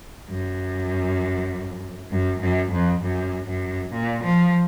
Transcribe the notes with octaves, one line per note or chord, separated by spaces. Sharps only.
F#2
F#2
F#2
F2
F#2
F#2
A#2
F3